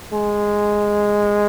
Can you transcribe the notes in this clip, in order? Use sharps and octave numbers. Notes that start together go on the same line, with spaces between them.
G#3